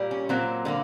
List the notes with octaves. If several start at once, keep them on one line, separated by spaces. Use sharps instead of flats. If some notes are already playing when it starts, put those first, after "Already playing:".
Already playing: A#2 G3 A#3
C#4
A#2 F#3 A#3 C4
D3 G3 A#3